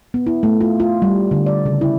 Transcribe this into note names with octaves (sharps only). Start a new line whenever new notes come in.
B3
E4
A3
F4
F4
G3
D3
D5
C#3
E4